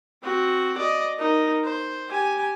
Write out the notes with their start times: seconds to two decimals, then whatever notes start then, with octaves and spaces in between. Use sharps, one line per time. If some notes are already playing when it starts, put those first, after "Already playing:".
0.22 C4 F#4
0.77 D5 D#5
1.18 D#4 A#4
1.64 C5
2.09 G4 G#5